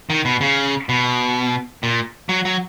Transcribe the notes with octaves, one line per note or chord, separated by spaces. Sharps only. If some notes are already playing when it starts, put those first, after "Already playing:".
D#3
B2
C#3
B2
A#2
F#3
F#3